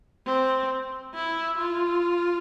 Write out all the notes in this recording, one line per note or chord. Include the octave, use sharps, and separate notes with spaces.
C4
E4
F4